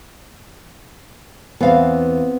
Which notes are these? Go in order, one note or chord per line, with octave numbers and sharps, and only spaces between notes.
E2 B3 C4 F5